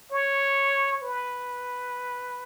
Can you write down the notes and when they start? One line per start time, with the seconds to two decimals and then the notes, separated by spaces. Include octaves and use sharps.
0.12 C#5
1.02 B4